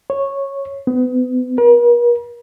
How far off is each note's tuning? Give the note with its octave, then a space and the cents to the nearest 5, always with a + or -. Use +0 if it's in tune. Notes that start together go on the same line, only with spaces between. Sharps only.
C#5 -10
B3 +35
A#4 +45